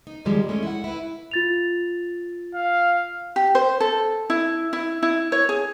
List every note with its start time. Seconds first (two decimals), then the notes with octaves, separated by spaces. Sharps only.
0.07 D#4
0.25 B2 D3 D#3 F3 G3 G#3
0.48 E3 G#3 A3 C#4
0.63 E4 F#5
0.84 E4 B4
1.31 F4 A6 F7
2.55 F5
3.36 G4
3.55 C5
3.80 A4
4.30 E4
4.73 E4
5.03 E4
5.32 C#5
5.49 G#4